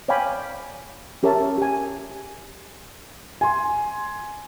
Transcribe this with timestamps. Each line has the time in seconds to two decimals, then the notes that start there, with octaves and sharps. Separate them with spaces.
0.08 C#5 D5 F5 G5 G#5 B5
1.23 C#4 G4 A#4 C#5 E5 A5
1.58 G4 G#5
3.41 G#5 C6